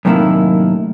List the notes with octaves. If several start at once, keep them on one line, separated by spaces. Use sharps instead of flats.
F#2 A2 C3 D#3 A#3 E4